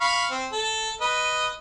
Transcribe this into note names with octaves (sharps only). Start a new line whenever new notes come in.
F5 B5 C#6
C4
A4
B4 D#5